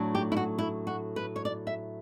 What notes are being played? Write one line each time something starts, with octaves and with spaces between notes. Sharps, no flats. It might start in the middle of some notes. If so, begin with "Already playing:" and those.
Already playing: A2 F#3 A3 D4
G4
E4
F#4
E4
F#4
B4
C#5
D5
E5